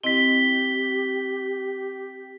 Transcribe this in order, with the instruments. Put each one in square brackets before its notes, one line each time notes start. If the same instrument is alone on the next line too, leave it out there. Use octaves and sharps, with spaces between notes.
[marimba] C4 E4 D#5 [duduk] G4 [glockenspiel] B6 G7